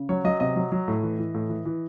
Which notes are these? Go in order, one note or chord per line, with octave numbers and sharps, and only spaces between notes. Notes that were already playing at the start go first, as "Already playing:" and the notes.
Already playing: C#3
F#3 C#5
F#3 D#5
C3 D#5
F#3
F#3
A2
E3
E3
A2
E3
E3